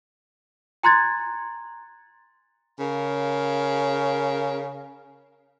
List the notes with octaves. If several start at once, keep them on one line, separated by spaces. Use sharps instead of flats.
G#5 A#5 C6 F#6 G#6 A6
C#3 A#4 C#5 F5